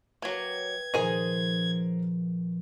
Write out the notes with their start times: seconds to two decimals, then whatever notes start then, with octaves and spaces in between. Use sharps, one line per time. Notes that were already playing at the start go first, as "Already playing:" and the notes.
0.22 F#3 A#3 B4 D#5 G5 G#6
0.94 A#2 D#3 F3 D#4 G#4 A#4 C5 G#5